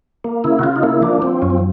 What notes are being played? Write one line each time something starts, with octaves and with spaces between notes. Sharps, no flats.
A#3
C#3 E4
F#4
C#3 F4
D#4
A#3 E4
F3 D4
F3 C4
F#2 C#4
C4